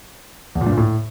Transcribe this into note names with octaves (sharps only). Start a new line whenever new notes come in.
E2
A#2
G2
A#2
A2